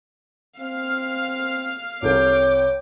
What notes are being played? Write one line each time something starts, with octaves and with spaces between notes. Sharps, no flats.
C4 F5
C2 C3 A4 C#5 G5 D6